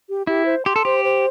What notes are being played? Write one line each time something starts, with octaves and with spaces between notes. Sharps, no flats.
G4
E4 G4
C5
G4 C6
A4
G4 C5
C5